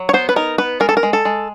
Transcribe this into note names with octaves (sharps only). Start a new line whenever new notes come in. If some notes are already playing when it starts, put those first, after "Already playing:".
Already playing: F#3
C#5
B3 C5
B4
D#4 A#4
B3 B4
G#3 A#4
A4
A#4
G#3
A4
G#3